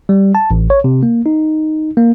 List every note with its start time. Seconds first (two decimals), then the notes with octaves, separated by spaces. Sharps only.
0.09 G3
0.35 A5
0.51 A1
0.70 C#5
0.84 C3
1.03 A#3
1.26 D#4
1.97 A#3